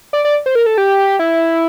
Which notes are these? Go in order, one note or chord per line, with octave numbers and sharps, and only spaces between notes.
D5
D5
C5
A#4
A4
G4
E4